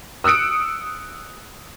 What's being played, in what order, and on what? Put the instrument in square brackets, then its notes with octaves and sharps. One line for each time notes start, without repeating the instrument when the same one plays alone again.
[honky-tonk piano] D#6 E6 F#6 C#7 D7